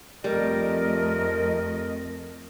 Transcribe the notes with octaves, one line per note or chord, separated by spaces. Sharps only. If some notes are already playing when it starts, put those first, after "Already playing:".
F2 G3 A3 A#4 D#5